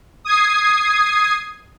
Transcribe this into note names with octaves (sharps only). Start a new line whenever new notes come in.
D#6 G#6 C7